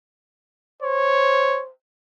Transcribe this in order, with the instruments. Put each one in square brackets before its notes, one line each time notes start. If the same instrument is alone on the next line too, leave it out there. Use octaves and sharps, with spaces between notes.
[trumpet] C5 [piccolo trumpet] C#5